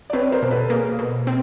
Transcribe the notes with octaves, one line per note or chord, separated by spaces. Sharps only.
D5
C4 B4 C#5
A#4 C5
B2
A4 B4
A#3 G#4 A#4
B2
C4